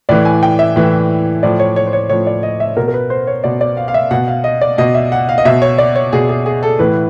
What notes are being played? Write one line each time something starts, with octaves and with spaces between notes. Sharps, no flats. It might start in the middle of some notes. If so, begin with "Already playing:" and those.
A2 E3 D5
G#5
G5
E5
A2 E3
A2 F3 D5
C#5
C#5
C5
C#5
A2 F3 C#5
D5
D#5
E5
B2 A#4
A#4
B4
C5
C#5
B2 D5
D5
F5
F5
E5
B2 F#5
F5
D#5
D5
B2 D#5
E5
F#5
F5
D#5
B2 E5
C#5
D5
C#5
B2 G#4
G#4
G#4
A4
A2 E3 B4